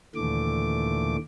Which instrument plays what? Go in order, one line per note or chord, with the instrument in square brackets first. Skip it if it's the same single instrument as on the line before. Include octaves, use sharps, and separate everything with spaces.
[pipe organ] D#2 A#2 D3 E3 A3 D6